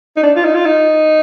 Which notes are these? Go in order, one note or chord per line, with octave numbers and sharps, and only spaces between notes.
D#4
D4
F4
D#4
F4
D#4